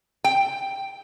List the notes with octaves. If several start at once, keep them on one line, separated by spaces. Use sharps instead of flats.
G5